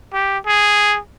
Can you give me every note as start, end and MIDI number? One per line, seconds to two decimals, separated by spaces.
0.13 0.38 67
0.47 0.98 68